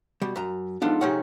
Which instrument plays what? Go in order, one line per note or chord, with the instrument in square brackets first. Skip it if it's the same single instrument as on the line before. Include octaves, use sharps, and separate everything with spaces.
[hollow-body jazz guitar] B2 G3
F#2 A#5
[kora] G#2 F3 A4 [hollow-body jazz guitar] B3 D4 F4
[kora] C3 C#4 [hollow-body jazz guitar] G#3 D#4 F#5